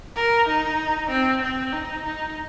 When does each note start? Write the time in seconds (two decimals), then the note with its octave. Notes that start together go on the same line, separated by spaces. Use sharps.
0.16 A#4
0.48 D#4
1.10 C4
1.42 C4
1.72 D#4
2.04 D#4